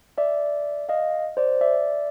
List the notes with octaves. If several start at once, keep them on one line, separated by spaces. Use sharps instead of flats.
D5 E5
D#5 F5
C5 D5
D5 E5